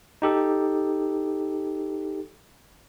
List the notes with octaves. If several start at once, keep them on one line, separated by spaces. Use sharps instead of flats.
D#4 G4 A4